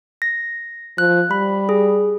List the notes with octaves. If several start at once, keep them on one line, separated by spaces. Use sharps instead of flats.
A#6
F3 F#6
G3 B5
G#4